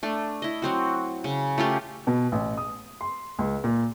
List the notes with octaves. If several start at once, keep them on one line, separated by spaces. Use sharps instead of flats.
A3 D4
E4 D#5
F#3 C4 F#4
C#3
A3 C#4 F4 G4
B2
A1
D#6
C6
C#2
A#2